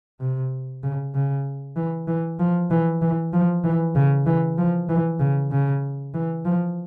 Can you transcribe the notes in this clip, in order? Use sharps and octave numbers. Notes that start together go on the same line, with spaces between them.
C3
C#3
C#3
E3
E3
F3
E3
E3
F3
E3
C#3
E3
F3
E3
C#3
C#3
E3
F3